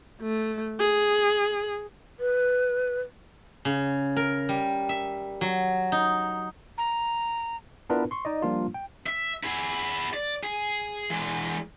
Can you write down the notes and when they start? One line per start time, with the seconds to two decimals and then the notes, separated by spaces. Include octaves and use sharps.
0.21 A3
0.80 G#4
2.19 B4
3.65 C#3
4.17 A#4
4.49 G3
4.89 E5
5.41 F#3
5.92 D#4
6.78 A#5
7.90 B3 D4 E4 F4 A#4 B4
8.11 C6 C#6
8.25 D#4 D5 D#5
8.42 F3 G3 A#3 D4 F4
8.74 G5
9.07 E5
9.43 E4 G#4
10.14 D5
10.43 G#4
11.10 E3 G#3